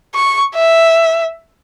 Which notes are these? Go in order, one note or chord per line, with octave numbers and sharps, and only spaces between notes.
C#6
E5